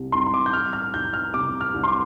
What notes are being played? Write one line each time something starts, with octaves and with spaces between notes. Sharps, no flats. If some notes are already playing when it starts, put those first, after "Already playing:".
Already playing: C2 C3
C2 C6
C6
D6
G6
G3 F6
F6
C2 G6
F6
C3 D6
F6
C2
C6
D6